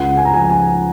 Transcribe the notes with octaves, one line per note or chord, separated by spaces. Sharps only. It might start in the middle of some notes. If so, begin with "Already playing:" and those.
Already playing: C#2 F#5
G#5
A#5
F3 G#5
G#5